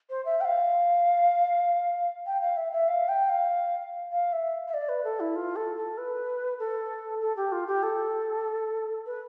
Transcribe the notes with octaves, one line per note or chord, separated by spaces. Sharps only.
C5
E5
G5
F5
G5
F5
E5
E5
F5
G5
F5
F5
E5
E5
D5
B4
A4
E4
F4
A4
A4
B4
A4
A4
G4
F4
G4
A4
B4